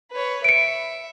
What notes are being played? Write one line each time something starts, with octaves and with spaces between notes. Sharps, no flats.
B4 C#5
E5 C#7 D7